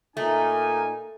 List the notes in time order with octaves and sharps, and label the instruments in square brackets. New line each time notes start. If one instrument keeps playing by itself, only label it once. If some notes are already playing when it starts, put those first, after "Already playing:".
[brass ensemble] A#2 A#4 G#5 [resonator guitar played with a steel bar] A3 [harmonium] D#4